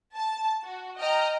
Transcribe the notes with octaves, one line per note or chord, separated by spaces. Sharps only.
A5
F#4
D#5 G5 A#5 F6